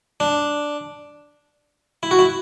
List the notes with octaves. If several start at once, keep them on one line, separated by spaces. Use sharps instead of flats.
D4
E4
F#4
E4